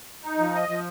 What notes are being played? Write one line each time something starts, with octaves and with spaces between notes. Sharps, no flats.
D#4
F3
D#5
F3